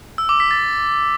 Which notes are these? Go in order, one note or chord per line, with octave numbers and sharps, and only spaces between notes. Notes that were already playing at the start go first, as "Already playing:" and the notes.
E6
D6
B6
A6